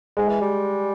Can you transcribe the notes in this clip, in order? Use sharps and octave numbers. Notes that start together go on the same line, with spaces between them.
G#2 G#3
E3
G3